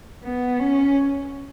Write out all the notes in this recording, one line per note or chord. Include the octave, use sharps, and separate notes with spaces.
B3
C#4